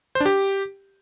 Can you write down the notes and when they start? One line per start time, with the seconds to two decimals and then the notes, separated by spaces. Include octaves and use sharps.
0.15 C5
0.20 D4
0.26 G4